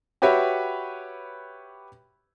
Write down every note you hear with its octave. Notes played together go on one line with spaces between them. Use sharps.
F#4 G4 B4 C#5 E5